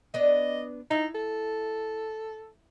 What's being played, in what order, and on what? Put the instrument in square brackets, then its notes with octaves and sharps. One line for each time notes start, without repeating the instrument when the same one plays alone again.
[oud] B3 D4 D5 [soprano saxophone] D#5
[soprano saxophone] D#4 [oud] E4
[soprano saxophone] A4